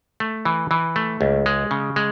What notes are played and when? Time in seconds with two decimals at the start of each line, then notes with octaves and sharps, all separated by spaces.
0.20 A3
0.45 E3
0.71 E3
0.96 A3
1.21 C#2
1.46 G#3
1.71 C#3
1.96 G#3